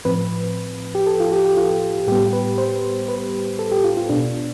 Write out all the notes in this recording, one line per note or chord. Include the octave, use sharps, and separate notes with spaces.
A2 F3 C4 B4
G4
A4
F4
G4
G4
F4
A2 G3 B3 G4
B4
C5
B4
A4
G4
F4
F4
B2 B3 D4